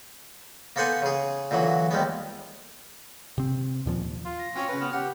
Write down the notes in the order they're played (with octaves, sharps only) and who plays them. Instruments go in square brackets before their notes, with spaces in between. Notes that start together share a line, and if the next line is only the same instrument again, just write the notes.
[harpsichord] A#3 B3 A4 C5 F#5 G#5
C#3 G#4
A#2 D3 E3 F#3
D#2 G3 G#3 B3
[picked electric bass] C3 C4
D#2 A#2 F3
[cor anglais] F4
[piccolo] A#6
[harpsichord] C4 F4 C#5 [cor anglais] C#4
[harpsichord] C#3 C#4 [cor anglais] B4
[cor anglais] B3 [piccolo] F6
[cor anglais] G4 [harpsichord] F#5